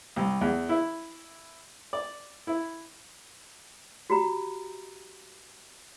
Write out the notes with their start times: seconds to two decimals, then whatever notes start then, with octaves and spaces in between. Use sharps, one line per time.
0.16 C2
0.41 E2
0.69 E4
1.93 D5
2.47 E4
4.10 F#4 G4 A#5 B5